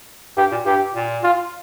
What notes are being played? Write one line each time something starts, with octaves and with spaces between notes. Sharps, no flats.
G2 G4
A#2
G2 G4
A#2
F4